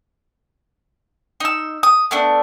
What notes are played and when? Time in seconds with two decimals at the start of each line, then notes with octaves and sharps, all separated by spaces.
1.40 D#4 E6
1.83 D#6
2.11 A3 B3 D4